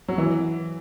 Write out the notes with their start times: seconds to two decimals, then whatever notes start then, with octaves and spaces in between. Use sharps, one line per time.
0.08 F#3
0.18 E3